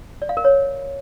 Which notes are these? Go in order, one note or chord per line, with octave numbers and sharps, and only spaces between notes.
D5
F5
A#4
C#5